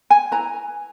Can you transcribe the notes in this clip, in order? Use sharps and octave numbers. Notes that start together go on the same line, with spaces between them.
G#5
E4 B4 A#5